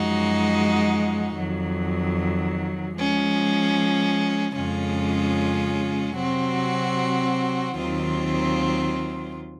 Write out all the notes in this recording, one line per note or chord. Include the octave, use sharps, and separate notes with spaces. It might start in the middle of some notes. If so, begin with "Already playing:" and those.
Already playing: F#2 F3 G#3 D#4 F#4
F2 D#3 F#3
F3 G#3 C#4
F2 C#3 G#3 C#4 F4
C3 F#3 C4 F#4
D#2 D#3 F#3 C4 F4